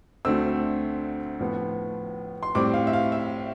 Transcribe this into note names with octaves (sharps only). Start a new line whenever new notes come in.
D2 D3 A3 C4 E6
A2 F3 B3
C6
A2 G3 C4 D6
F5
E5
F5
E5